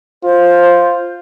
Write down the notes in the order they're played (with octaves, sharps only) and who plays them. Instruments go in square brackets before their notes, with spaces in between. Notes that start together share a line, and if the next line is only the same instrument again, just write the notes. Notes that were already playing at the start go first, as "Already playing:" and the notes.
[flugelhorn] F4 [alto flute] C5